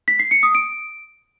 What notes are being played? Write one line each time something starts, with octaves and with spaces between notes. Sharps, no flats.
B6
C7
C#7
D#6
D7